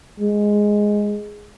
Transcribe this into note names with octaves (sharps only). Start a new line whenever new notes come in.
G#3